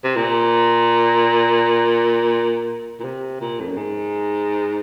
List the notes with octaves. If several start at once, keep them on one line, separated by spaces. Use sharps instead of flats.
C3
A#2
A#2
C3
A#2
F2
F#2
G#2